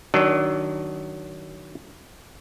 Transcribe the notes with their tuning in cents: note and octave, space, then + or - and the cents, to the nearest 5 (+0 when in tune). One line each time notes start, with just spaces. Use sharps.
D#3 +0 F#3 +25 D4 +0